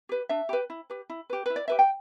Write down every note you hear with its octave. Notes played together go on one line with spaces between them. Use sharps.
G4 B4
D4 E5
G4 B4
E4
G4 B4
E4
G4 B4
E4 B4
D5
G4 B4 E5
G5